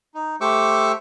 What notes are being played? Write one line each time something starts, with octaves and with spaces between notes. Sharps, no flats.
D#4
A3 G4 C5 C#6 D6 E6